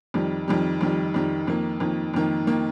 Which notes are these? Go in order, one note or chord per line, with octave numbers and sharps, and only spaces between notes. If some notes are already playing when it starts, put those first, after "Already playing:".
F2 D#3 G3
F2 D#3 G3
F2 D#3 G3
F2 D#3 G3
F2 D#3 A#3
F2 D#3 A#3
F2 D#3 A#3
D#3 A#3